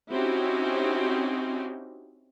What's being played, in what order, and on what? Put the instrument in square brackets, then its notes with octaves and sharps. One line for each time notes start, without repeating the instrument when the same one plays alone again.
[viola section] C4 C#4 D#4 E4 F#4 G4